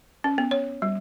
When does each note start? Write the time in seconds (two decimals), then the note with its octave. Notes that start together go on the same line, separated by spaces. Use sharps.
0.24 C#4
0.38 B3
0.51 C#5
0.82 G3